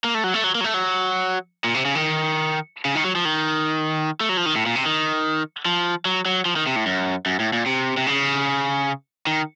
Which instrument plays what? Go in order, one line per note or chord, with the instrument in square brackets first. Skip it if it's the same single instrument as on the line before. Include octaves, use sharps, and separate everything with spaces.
[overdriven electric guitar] A#3
A3
F#3
A3
F#3
A#3
F#3
A3
F#3
A#2
C3
C#3
D#3
C#3
D#3
F#3
F3
D#3
A3
F#3
F3
D#3
A2
A#2
C3
D#3
F3
F#3
F#3
F3
D#3
C3
A2
F#2
F#2
A2
A#2
C3
C3
C#3
D#3